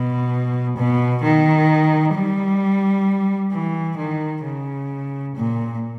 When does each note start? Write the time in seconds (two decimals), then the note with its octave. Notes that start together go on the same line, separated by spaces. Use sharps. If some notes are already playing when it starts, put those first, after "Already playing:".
Already playing: B2
0.77 B2
1.23 D#3
2.15 G3
3.52 E3
3.97 D#3
4.44 C#3
5.35 A#2